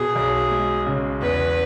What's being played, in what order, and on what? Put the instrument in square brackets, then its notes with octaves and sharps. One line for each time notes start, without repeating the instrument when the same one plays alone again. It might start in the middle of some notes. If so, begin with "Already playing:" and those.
Already playing: [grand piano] B2 [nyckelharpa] G#4
[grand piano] B1
G#3
C#3
[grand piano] E2 [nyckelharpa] B4